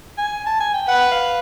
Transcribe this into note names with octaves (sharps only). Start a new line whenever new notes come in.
G#5
A5
G#5
G5
B4 F#5
F5